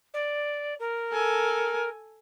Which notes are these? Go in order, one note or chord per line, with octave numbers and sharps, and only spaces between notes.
D5
A#4
A4 G#5